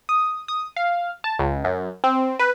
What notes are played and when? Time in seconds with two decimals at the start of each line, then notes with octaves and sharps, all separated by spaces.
0.09 D#6
0.48 D#6
0.77 F5
1.24 A5
1.39 C#2
1.64 F#2
2.04 C4
2.39 B4